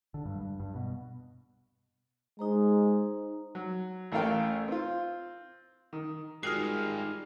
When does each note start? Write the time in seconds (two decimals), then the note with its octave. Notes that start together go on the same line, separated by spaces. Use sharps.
0.14 D3
0.25 G2
0.41 G2
0.60 G2
0.75 B2
2.39 G#3 D#4 C5 A#5
3.55 F#3
4.12 A1 A3 C#4 A#4 F5 G5
4.68 C4 F4
5.93 D#3
6.43 D#3 G3 G#3 D#4 F4 F#4 F6 C7